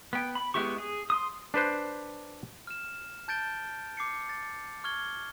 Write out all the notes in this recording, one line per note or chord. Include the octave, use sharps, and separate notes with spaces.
B3 G5
B5
G#3 B3 E4 G4 C#6
G#4
C6 D#6
D4 B4 C5
F6 E7
A5 G6 A6 D7 G7
D6 C7 C#7
A6
C#6 F6 G#6 G7